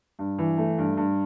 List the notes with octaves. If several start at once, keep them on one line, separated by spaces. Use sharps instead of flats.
G2
E3
A3
G2
G2